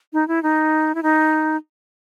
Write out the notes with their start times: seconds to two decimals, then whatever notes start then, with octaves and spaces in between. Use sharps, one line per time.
0.13 D#4
0.28 E4
0.43 D#4
0.95 E4
1.03 D#4